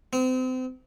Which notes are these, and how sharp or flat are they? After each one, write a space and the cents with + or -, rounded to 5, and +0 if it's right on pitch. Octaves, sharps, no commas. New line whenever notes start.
C4 -35